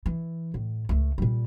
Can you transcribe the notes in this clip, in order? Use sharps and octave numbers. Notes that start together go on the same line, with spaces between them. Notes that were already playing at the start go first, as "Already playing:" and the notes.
E3
A2
C#2 A3
A#2 G3